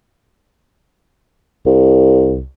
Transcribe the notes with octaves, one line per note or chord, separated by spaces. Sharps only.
C2